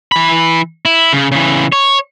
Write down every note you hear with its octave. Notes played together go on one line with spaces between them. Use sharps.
E3 B5
E4
C#3
C#3 E3
C#5